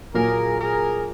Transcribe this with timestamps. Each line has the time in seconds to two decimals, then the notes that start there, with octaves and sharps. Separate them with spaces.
0.14 A#2 F#3 A#3 G#4 A#4
0.60 G#4 A#4